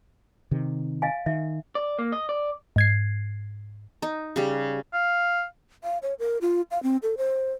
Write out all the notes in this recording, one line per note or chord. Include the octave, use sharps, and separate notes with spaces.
C3 D#3
D#5 F5 G#5
D#3 E5
D5
A#3
D#5
D5
G#2 G#6 C7
D#4
C#3 G3
F5
F5
C#5
A#4
F4
F5
C4
A4
C5